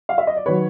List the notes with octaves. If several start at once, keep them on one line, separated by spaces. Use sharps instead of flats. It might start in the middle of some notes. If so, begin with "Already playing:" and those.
F5
E5
D#5
D5
D#3 F#3 B4 C#5